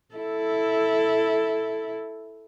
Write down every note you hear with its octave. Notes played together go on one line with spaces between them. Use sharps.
E4 A4